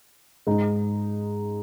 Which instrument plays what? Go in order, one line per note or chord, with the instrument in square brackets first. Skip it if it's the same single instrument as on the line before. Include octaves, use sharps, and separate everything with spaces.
[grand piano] G#2 G#3 D#4